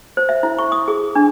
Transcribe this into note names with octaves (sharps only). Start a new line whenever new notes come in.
C5
E5
E4
C#6
D#6
G#4
D4